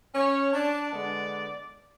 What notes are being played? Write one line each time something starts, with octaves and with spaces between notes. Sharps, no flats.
C#4 C#5
D4 D5
D3 G#3 B3 D4